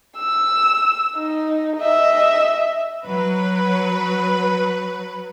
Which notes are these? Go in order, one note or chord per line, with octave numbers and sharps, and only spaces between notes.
E6
D#4
D#5 E5
F#3 B4